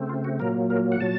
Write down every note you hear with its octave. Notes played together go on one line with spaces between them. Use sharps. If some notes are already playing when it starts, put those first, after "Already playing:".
Already playing: C#3 A3 C4
F4
F#4
A#2 F#3 A#3 A#4
A#4
F#5
A#2 F#3 A5